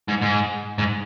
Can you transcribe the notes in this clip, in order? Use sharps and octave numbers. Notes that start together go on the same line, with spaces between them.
G#2
G#2
G#2